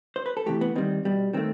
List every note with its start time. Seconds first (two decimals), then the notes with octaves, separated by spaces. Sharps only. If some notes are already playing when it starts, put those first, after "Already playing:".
0.16 C5
0.26 B4
0.37 A4
0.46 C3 E3 A3 G4
0.61 B3
0.76 D#3 G3 C4
1.05 B2 G3
1.33 D#3 A3 C4